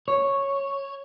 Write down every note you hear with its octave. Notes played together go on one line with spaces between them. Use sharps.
C#5